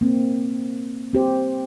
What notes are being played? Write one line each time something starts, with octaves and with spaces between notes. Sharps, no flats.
A#3 C4
C4 G4 C5